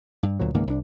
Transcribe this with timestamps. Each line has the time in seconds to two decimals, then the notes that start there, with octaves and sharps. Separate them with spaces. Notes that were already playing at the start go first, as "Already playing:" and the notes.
0.23 G2
0.39 D2 A#2 F#3
0.54 C#2 G#2 D#3 A#3
0.67 C2 D4